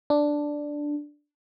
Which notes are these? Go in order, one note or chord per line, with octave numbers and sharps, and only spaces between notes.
D4